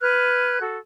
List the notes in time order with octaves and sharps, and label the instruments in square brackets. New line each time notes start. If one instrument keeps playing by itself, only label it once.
[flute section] B4 F6 F#6 G#6
F#4 A4